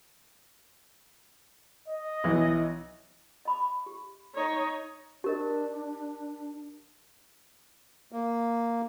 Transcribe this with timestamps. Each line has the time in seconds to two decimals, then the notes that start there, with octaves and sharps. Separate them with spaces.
1.88 D#5
2.24 B1 E3 E4
3.45 D#5 B5 D6
3.86 G4
4.35 D#4 C#5
5.24 D4 G4 A#4 D#5
8.12 A#3